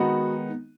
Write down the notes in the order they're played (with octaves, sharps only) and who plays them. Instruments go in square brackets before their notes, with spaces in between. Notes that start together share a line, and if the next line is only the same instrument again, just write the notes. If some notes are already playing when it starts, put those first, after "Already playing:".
Already playing: [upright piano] D#3 G#3 B3 D#4 F#4